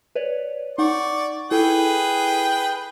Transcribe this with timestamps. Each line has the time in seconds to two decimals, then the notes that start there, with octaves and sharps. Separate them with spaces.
0.15 B4 C#5 D5
0.78 D#4 D5 F#5 C#6
1.51 E4 G#4 A4 B4 G5